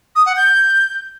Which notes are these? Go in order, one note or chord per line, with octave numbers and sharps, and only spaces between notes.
D#6
F#5
G6